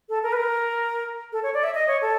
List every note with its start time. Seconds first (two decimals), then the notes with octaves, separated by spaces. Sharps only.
0.09 A4
0.23 A#4
0.33 B4
0.37 A#4
1.32 A4
1.43 C#5
1.54 D5
1.63 E5
1.74 D#5
1.88 C#5
2.02 A4